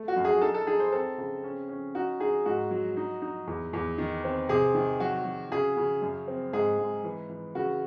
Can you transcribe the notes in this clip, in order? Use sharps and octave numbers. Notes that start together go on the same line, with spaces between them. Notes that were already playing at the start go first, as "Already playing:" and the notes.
Already playing: A3
F#4
F#2
G#4
D#4 A4
A4
D#4 G#4
C5
C4 A4
C#3
C#4
C#4
D#4 F#4
D#4 G#4
G#2 F#4
F#3
D#4
D#4
E2
E2
D#3
C4
C3 G#4
D#3
F#3 F#4
F#3
C#3 G#4
C#3
F#2
C4
G#2 G#4
G#2
E3
E3
C#3 F#4